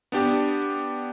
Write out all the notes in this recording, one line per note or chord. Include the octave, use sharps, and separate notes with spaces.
B3 D4 G4